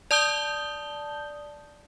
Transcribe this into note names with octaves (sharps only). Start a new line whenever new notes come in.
D5 A5 D#6 G6 G7